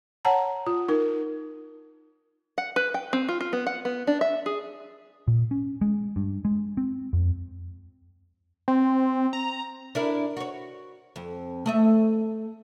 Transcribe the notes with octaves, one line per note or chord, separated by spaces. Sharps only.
C#5 F#5 A5 A#5
F4
D#4 A#4
F#5
B4
G5
C4
F4
F4
B3
F#5
B3
D4
E5
G#4
A#2
C#4
G#3
G2
G#3
C4
F2
C4
A#5
D4 E4 A#4
F#4 C#5
F2
A3 D#5 E5